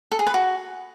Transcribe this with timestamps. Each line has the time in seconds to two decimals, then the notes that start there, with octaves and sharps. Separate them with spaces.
0.12 A4
0.19 G#4
0.27 B4
0.34 F#4